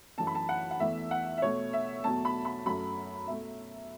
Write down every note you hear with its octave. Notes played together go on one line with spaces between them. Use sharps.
F#2 E3 A3 A5
B5
A5
F#5
F#5
E2 E3 A3 E5
F#5
E5
B2 A3 C#5
E5
E2 B2 F#3 A3 A5
B5
B5
F#2 F#3 A3 B5
B2 A3 E5